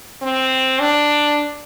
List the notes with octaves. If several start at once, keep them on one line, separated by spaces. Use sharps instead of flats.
C4
D4